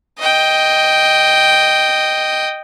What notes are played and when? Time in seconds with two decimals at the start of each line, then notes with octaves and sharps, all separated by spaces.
0.19 D#5 G5